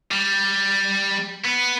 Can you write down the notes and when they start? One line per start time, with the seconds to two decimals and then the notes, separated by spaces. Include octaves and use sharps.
0.12 G3
1.44 B3